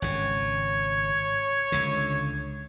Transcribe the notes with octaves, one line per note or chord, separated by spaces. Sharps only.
G#1 C#3 C#5
C#2 D3